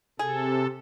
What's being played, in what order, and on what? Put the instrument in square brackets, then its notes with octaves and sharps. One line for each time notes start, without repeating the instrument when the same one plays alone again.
[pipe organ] C3 A4 [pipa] G#4